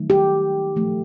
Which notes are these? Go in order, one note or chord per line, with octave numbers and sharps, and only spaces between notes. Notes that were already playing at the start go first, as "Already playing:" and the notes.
Already playing: D#3 F#3 A3
G4
A#2 F3 A3